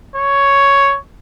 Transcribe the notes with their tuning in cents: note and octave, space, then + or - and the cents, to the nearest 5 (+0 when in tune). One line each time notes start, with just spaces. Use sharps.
C#5 +5